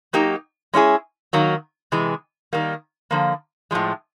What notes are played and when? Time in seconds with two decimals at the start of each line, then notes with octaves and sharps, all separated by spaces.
0.13 F#3 A#3 D#4 G4
0.74 G#3 C#4 E4 G#4
1.33 D#3 F#3 A#3
1.92 C3 E3 G#3
2.53 D#3 G3 A#3
3.11 D3 F3 A#3
3.71 A2 F3 G#3